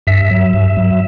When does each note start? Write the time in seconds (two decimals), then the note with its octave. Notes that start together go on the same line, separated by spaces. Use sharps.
0.07 G2 E5
0.31 F#3
0.53 G2
0.77 F#3